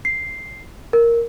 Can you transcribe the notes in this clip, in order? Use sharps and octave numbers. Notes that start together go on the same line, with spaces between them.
C7
A#4